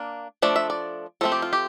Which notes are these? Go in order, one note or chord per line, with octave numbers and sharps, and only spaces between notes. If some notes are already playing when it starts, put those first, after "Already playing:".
Already playing: A#3 D4
F3 A3 D4 D5
E5
D5
F3 A3 C4 A4
G4
F4
G4